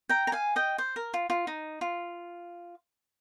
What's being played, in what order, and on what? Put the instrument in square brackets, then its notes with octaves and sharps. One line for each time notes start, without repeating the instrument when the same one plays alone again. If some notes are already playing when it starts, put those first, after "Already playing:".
[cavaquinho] G5 A#5
A#5
F5 G#5
D#5 G5
C5
A#4
F4
F4
D#4
F4